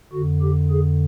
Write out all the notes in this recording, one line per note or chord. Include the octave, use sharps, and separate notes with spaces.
F2 D3 F#4
G4
G#4